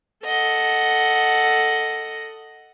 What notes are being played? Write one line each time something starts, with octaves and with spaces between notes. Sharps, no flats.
A4 D#5 F#5